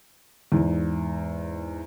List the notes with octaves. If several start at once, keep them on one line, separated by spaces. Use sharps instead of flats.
E2 G#2